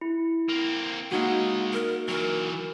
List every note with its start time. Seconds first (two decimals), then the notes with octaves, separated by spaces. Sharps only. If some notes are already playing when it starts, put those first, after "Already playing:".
0.01 E4
0.49 A#3 C4
1.12 C#2 G#3 A#3 D#4 F#4 F#5
1.73 A#4
2.08 E3 F#3 A#4